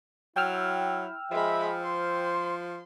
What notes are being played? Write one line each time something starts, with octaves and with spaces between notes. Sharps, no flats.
F#3 E4 G5 E6 F6
F3 G#3 E5 B5
C5 C6